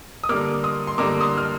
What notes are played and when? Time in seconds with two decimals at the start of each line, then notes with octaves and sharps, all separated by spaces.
0.24 D#6
0.29 D3 G3 A#3 D6 F6
0.63 C6 D#6
0.87 C6
0.98 D3 G3 A#3 A#5 D6
1.21 C6 D#6
1.38 F6